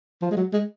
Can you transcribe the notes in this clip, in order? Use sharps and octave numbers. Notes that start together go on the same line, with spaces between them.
F3
G#3
F#3
G#3